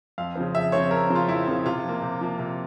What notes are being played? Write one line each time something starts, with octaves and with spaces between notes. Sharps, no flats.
F2 F5
C#3 F3 C4
F2 E5
C#3 F3 C4 C#5
F2 A#4
C#3 F3 C4
F4
F2 E4
C#3 F3 C4
C3 F4
F3 A#3
C3
F3 A#3
C3